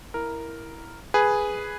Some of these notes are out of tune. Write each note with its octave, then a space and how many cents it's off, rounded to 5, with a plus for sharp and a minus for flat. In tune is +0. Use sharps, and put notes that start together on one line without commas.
E4 +0 A#4 +0
G#4 +0 B4 +0